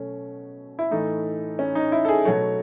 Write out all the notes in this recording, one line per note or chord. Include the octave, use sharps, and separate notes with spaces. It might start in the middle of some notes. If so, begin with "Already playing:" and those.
Already playing: B2 F#3 A3 C#4
E4
A2 E3 A3 D#4
C#4
D#4
E4
A4
G#4
B2 F#3 A3 C#5